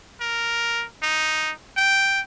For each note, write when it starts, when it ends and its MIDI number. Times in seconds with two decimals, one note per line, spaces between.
0.21 0.85 70
1.03 1.51 63
1.77 2.21 79